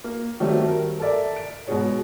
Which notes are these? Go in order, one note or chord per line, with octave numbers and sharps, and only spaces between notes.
A#3
D#3 F#3 G3 A3 C4
A#4
A4 A#4 D5 E5
D7
G#2 B2 F#4 G#4 C#5